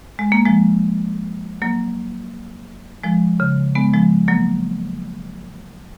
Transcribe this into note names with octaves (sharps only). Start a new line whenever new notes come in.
G#3
A#3
F3 G#3
F#3 A#3
F3 G#3
C#3
G#3 B3
F3 G#3
F#3 A#3